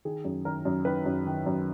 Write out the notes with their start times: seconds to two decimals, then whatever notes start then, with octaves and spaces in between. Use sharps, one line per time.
0.05 D#3 G#4
0.25 F#2
0.45 D#3 A#4
0.65 F#2
0.85 D#3 B4
1.06 F#2
1.27 D#3
1.46 F#2